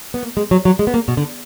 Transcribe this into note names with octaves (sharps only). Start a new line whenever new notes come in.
B3
A#3
G#3
F#3
F#3
G#3
B3
A#3
B2
D3